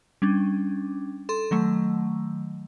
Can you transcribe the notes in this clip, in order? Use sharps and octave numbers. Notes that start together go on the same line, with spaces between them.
G3 C#4 D4
A4 C6
D#3 F#3 A3